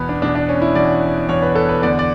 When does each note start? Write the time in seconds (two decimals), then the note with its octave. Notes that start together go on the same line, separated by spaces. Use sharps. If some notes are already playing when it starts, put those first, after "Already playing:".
Already playing: E2 B2 B3
0.09 D4
0.22 E2 B2 D4
0.35 D4
0.49 C#4
0.62 E4
0.75 E2 B2 D5
1.29 E2 B2 C#5
1.42 B4
1.55 A4
1.69 B4
1.82 E2 D3 D5
1.99 D5